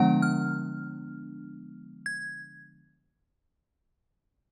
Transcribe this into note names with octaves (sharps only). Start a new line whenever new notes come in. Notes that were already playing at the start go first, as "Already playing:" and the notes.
Already playing: D3 F3 G#3 B3 D4 F#5
F6
G#6